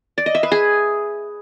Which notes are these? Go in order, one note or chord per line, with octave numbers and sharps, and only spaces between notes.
D5
D#5
E5
B4
G#4